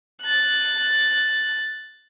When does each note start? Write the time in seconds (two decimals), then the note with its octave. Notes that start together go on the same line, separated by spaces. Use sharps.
0.23 F#6 A6